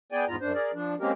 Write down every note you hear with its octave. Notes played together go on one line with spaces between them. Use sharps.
B3 G#4 D5 G5 G#5
E2 G#2 B3 F4 A#5
F#2 D4 C5
G#4 A#4 D5
F3 D4
G#3 A#3 C4 C#4 G4 A#4